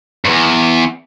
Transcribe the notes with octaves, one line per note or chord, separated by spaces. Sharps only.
E2 G2